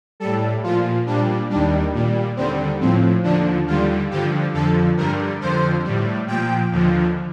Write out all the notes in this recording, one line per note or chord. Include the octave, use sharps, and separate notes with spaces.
A2 G3 A4
A#2 F3 F4
A#2 G3 D4
D#2 D#3 G3 D4
A#2 G3
D#2 D3 G3 C4
A2 F3 C4
D#2 D3 F3 D4
D#2 D3 G3 F4
G2 D3 F3 G4
F2 D3 F3 A4
G2 D3 G3 A#4
F2 D3 F3 C5
A2 G3
A#2 F3 G5
D#2 D3 F3